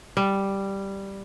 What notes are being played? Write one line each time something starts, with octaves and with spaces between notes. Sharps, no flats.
G3